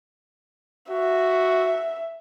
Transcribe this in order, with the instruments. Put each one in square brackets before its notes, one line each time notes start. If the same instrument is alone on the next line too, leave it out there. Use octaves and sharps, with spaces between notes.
[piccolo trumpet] F#4 [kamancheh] E5